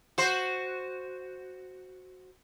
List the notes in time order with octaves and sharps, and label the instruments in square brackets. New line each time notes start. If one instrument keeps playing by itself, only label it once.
[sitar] F#4 C5